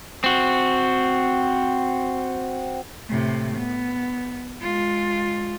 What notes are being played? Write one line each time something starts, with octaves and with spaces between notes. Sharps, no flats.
C4 F#4
A2 C3
B3
G#3 F4